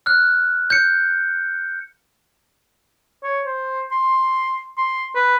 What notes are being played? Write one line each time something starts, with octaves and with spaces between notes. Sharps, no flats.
F6 F#6
G6 C#7
C#5
C5
C6
C6
B4